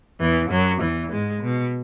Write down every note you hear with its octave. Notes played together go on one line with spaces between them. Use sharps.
E2 E3
F#2 F#3
E2 E3
G#2 G#3
B2